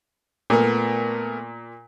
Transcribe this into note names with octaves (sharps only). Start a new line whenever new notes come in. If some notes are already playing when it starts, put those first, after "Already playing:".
A#2 A3 B3 A#4